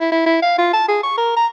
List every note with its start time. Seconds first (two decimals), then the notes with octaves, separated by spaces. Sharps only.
0.01 E4
0.12 E4
0.26 E4
0.42 F5
0.58 F4
0.73 A5
0.88 G#4
1.03 C#6
1.18 A#4
1.36 A#5